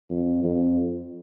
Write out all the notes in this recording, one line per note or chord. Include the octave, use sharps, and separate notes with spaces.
F2
F2